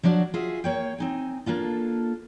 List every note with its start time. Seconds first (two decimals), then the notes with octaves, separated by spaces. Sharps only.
0.03 F3 F#3 D4 D#4 F#4
0.34 F4 F#4 G#4 E5
0.64 A#3 C#5 G5
0.98 C4 D#4 G#5
1.46 A#3 D4 F4 A4